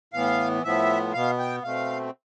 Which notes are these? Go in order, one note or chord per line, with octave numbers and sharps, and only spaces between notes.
A2 E3 B3 F5
A2 F3 B3 E5
B2 B3 F5
G5
B2 A3 C4 F5